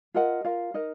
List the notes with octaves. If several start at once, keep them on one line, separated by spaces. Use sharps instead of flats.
F4 A#4 D#5 F#5
F4 A#4 F5
D#4 A#4 D#5